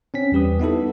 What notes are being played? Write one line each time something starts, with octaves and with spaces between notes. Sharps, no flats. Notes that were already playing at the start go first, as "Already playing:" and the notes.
C4 C#4 B6
E2 G3 G4 B4 D#6
B3 D#4 E4 A4